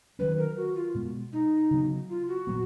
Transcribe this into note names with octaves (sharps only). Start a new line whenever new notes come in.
D#3 F#3 C#4 B4
A#4
F#4
F4
B2 G#3 B3
D#4
C#3 F#3 B3
F4
F#4
A#2 F#3 B3